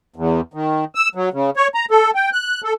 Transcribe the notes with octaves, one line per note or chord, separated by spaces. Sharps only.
E2
D#3
E6
F#3
C#3
C#5
A#5
A4
G5
F#6
A4